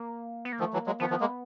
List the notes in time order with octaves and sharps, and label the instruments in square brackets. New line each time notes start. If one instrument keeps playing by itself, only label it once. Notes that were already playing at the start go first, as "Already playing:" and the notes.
Already playing: [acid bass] A#3
B3
A#3
[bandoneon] D#3 F3 [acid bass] A3
[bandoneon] E3 F#3
[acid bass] A#3
[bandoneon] F#3 G#3
[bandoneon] D#3 F3 [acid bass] B3
[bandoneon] D#3 F3
G#3 A#3